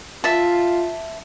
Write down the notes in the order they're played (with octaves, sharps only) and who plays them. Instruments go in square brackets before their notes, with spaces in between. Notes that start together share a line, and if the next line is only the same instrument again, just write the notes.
[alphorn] F4 [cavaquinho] E5 A5